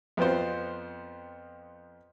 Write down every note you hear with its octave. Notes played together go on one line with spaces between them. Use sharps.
F2 B3 C4 F4 C5